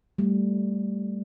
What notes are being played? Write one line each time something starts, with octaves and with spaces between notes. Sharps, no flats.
G3 A3